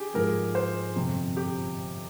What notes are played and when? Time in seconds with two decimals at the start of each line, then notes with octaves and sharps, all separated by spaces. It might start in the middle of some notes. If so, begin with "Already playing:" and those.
Already playing: G4 G#4
0.14 G#2 F3 G#3 A#4
0.55 C5
0.96 G1 F2 C3
1.37 G4